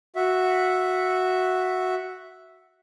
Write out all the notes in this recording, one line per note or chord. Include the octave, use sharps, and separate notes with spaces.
F#4 E5